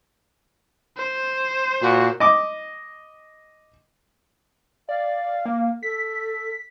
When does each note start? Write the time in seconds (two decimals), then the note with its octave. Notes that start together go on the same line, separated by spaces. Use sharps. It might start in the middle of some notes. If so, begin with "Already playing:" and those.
0.97 C5
1.82 A#2 F#4
2.20 D#5 D6
4.89 D5 F5
5.45 A#3
5.83 A4 B6